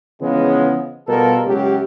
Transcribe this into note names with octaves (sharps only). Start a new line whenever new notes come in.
C#3 E3 F3 G#3 B3
B2 G3 F4 A4 A#4
C#2 F#2 G4